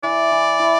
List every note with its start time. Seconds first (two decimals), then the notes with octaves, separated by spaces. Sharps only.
0.03 E3 D5
0.32 E3
0.60 E4